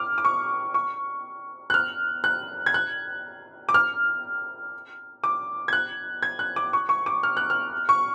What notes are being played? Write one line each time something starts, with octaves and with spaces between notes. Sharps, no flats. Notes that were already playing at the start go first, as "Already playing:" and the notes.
Already playing: D6 F6
D6
C#6
C#6
F#6
F6
F#6
G#6
F#6
D6
F6
D6
G#6
F#6
G#6
F#6
D6
C#6
C#6
D6
F6
F#6
F6
C#6